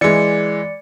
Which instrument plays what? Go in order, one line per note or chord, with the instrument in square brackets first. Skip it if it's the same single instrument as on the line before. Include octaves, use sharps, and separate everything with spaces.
[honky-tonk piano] E3 G#3 [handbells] D5 C#7